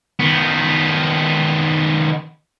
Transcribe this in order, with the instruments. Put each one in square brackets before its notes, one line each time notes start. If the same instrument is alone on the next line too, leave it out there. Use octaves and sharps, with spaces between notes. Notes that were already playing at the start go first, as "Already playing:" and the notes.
[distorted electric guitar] D#3 B3